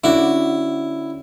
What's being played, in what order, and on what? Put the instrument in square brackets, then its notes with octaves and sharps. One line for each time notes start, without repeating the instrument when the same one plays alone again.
[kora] D3 F#4 D5 [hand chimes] C#4 [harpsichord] E4